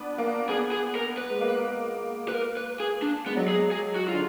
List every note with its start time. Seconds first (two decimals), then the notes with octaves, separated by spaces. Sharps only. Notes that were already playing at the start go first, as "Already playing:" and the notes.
Already playing: B3 D4
0.18 A#3
0.49 B3 G#4
0.72 G#4
0.95 A#4
1.18 B4
1.30 G#3
1.41 A#3
2.28 B4
2.34 A#4
2.57 B4
2.80 G#4
3.02 D4
3.26 G#3 B3
3.37 F#3
3.48 G#3 G#4
3.71 G#4
3.96 F#4
4.08 F4
4.13 D3